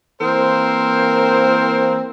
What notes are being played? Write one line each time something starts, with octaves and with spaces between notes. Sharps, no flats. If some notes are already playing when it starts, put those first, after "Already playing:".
E3 A#3 C4 A#4 C5